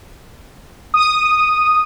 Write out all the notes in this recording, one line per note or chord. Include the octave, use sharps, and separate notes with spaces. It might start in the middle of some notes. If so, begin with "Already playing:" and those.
D#6